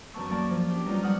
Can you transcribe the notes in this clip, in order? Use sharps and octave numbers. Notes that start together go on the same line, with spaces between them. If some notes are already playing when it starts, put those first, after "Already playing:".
F#2 D#3 B3 A5 C#6 E6
F#3 A#3 D5 A5
F3
C#4 D4 G4
F#3 G3 B3 D#4 F4
G3 F#5 D#6 F6